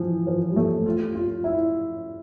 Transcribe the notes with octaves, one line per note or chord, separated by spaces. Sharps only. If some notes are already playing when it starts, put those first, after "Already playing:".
Already playing: E3 F3
F3
G3
A3
F4
F4
E4